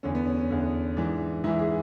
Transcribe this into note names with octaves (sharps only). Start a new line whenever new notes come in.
E2 D3 C#4
B3
C#4
C#4
E2 D3
G#2 E3 D4
G#2 E3 E4
G#4